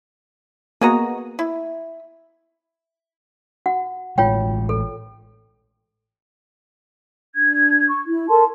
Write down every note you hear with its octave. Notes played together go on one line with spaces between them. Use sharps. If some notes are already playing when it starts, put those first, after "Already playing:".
A#3 B3 F#4 G#4 D#5 A#5
E4
F#4 F#5
A1 A2 G#3 F4 C#5 G5
A4
D4 G#6
C#6
E4
A4 A#4 A5 C6